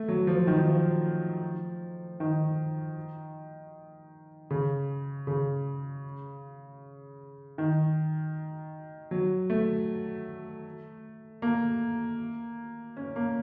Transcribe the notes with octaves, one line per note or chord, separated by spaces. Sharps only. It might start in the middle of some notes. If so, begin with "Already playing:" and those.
Already playing: A3
F#3
F3
D#3
F3
D#3
C#3
C#3
D#3
F#3
A3
A#3
C#4
A#3